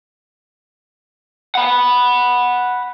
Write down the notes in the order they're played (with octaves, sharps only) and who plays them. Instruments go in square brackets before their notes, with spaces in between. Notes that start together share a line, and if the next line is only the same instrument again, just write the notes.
[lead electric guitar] F#5 B5